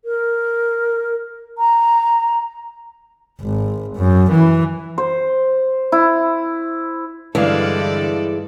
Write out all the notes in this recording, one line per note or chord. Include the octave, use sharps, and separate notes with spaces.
A#4
A#5
G#1
F#2
E3
C5
E4
G2 D3 E3 G#3 E4 A4 D5 F5